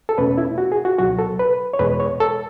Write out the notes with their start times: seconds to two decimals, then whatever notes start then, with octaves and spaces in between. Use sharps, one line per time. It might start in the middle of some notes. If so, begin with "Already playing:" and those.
0.09 A4
0.18 E2 B2 A3 C#4 B4
0.38 E4
0.58 F#4
0.72 G#4
0.85 F#4
0.98 C#2 B2 F#3 F#4
1.19 A4
1.39 B4
1.73 C#5
1.79 E2 B2 G#3 B4
2.00 C#5
2.20 A4